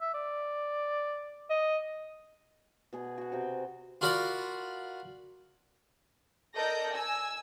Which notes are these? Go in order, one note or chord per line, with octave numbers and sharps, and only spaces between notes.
E5
D5
D#5
B2 G#4 D5
F#4 F#5
C3 F#4 G5
F4 F#4 A#4 D5 B5
A4 A#4 D5 D#5 G6 A#6
G#5 E6